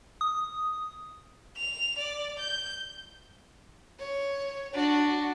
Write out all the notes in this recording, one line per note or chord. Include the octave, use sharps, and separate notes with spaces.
D#6
F7
D5
G6
C#5
D4 F#4